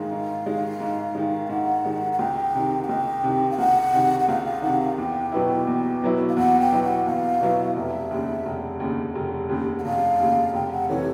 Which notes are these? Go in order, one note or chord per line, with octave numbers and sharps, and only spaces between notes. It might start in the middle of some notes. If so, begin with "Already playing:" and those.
Already playing: G#2 D#3 G#3 F5
G#2
D#3 G#3
G#2
D#3 G#3
G5
G#2 F#5
D#3 G#3
F#5
C#2 G5
C3 D#3
F#5
C#2 G5
C3 D#3
F5
C#2 F#5
C3 D#3
F#5
C#2 F5
F5
C3 D#3 F#5
F5
E2 G5
B2 F#3 B3 E4
E2
B2 F#3 B3 E4
F5
E2 F#5
G5
B2 F#3 B3 E4
F#5
E2 F5
B2 F#3 B3 E4
F1 E5
D#2 C#3
F1
D#2 C#3
F1
D#2 C#3
F#5
F1 F5
D#2 C#3
F1 G5
F#5
C3 E3 A3 C#5